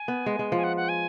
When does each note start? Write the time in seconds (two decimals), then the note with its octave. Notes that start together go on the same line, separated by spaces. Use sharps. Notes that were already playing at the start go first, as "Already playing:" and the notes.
Already playing: G#5
0.08 B3
0.26 G#3
0.39 G#3
0.52 F3 G#5
0.64 F#5
0.77 F#5
0.89 G#5